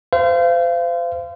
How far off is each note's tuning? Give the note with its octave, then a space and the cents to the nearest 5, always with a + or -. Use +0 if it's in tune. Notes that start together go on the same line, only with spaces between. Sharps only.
C5 -30 F5 -30